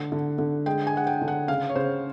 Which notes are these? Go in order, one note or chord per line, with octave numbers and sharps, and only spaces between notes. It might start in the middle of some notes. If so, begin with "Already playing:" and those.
Already playing: D3 A3 F#5
D3
D3
G#3 G5
G#5
G#3 F#5
G5
D3
F#5
C#3 F5
C#5
C#3 C5